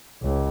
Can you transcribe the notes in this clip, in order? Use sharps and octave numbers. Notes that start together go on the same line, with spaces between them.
C#2